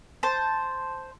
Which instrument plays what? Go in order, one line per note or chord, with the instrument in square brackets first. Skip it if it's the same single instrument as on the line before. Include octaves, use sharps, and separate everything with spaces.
[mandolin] C5 A5